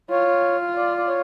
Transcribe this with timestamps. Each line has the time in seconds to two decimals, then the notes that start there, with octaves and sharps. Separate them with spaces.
0.10 F4 C#5
0.76 D5
0.97 D5
1.08 C#5